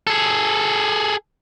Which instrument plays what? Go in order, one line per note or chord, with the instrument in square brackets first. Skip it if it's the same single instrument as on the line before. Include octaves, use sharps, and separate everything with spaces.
[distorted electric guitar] G#4 A4